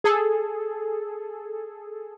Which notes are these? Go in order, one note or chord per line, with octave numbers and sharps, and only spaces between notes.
G#4 A4